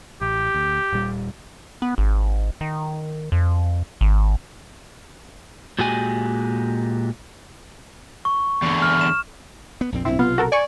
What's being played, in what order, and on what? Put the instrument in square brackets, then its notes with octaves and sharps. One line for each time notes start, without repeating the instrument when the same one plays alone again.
[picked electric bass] A1 [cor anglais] G4
[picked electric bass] D2
D#1 A#2 G3
[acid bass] B3
G#1
D#3
F2
G#1
[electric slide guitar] A#2 G#3 F#4 G4 G#5
[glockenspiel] C#6
[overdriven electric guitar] E2 D3
[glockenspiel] F6
E7
[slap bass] B3
A#1 F2 C4
[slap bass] B1 G2 A#2 [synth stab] C4 [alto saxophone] E4
[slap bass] B1 C3 [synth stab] B3 [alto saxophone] F4
[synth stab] F#4 A4 A#4
[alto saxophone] D5 [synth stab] G#5 C#6